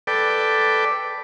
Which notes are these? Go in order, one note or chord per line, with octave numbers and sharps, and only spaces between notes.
A4 B4 D5 G5